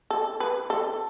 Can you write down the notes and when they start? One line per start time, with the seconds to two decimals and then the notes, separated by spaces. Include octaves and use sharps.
0.10 A4
0.40 B4
0.70 A4